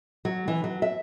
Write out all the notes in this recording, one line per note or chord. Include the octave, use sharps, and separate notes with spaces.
F#3
E3
F#3
E5